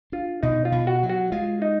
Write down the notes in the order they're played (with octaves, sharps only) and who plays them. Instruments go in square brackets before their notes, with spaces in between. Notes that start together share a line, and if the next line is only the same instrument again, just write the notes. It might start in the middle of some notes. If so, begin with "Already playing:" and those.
[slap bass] D4 [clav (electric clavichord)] F4
[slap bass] B2 [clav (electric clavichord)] D#4
[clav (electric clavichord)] F4
[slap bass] B2
[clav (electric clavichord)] F#4
[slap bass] F#3
[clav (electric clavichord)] F#4
[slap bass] G#3 [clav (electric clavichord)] F4
[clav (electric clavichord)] D#4